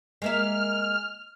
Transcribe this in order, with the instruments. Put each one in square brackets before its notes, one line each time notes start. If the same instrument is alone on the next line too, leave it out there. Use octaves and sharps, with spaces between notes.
[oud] G#3 A#3 E5 [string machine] F6